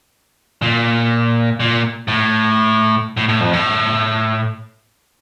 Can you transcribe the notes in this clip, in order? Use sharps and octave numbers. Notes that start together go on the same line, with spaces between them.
A#2
A#2
A2
A2
A2
F2
A2